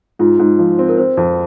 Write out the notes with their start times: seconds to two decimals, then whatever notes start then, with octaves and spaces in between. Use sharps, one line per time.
0.19 G#2 F4
0.39 G#2
0.59 F3
0.79 C4
0.89 A#4
0.98 C4 C5
1.17 F2